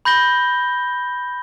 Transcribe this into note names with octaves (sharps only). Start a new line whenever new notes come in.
B5 G6 A#6 G7